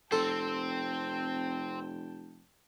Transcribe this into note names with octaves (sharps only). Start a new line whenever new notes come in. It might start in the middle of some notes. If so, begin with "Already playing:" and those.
F1 C4 A4 C5 G5 A5